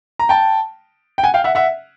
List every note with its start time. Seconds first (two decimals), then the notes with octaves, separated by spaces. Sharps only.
0.19 A#5
0.29 G5 A5
1.18 G5
1.23 F#5 G#5
1.34 F5 G5
1.44 E5 F#5
1.55 E5 F#5